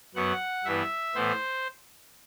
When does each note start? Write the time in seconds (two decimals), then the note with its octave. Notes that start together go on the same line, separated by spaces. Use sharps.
0.15 F#2 F#3 B3 F#5
0.65 G2 E3 B3 E5
1.14 A2 E3 B3 C5